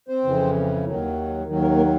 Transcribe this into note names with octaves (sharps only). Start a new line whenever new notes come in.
C4 C5
F2 C#3 E3
D#2 D#3 F#3
D#2 D#3 F#3
A#3 A#4
A#3 A#4